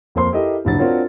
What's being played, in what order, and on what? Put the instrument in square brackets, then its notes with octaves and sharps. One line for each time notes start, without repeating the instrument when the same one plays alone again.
[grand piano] F2 A#3 C5 C6
E4 G4 A4 A#4 D#5
F#1 G2 F#3 A6
C4 D4 F4 F#4 A#4 C#5